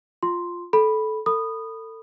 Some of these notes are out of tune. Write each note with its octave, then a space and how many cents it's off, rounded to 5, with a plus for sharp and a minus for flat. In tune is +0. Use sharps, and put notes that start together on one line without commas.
F4 +0 C6 +0
A4 -20 B5 -5
A4 +30 B5 +0 D#6 -15